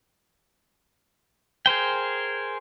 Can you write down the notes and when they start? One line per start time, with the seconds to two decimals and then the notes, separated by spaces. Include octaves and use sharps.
1.66 G#4 A#4 C5 G5